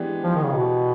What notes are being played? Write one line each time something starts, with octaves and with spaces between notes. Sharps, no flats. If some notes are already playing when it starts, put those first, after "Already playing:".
Already playing: E3 G#3 B3 D4 G4
F3
D#3
C#3
B2